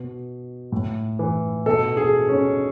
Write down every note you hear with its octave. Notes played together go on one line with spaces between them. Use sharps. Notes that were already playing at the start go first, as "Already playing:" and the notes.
Already playing: B2
A2
E3
B2 A4
G#4
C#4